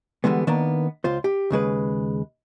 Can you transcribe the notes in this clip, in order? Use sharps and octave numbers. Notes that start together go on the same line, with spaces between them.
D3 E3 G3 G#3 B3
D#3 A#3 B3 D4
C#2 F4 C5
G4
D#2 C#3 G#3 B4